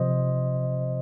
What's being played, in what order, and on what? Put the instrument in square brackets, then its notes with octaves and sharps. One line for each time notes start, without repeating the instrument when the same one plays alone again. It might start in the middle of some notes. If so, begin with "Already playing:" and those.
Already playing: [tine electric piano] C3 F3 C5 D#5